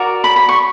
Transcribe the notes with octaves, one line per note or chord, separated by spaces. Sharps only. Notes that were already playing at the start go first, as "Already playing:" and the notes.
Already playing: F#4 A#4 D5
B5
B5
C#6